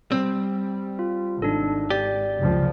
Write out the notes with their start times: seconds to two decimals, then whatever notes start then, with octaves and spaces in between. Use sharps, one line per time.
0.12 G3 C4
0.99 F4
1.42 G#1 D4 D#4 A4
1.90 G4 D5
2.40 F#1 C#2 F3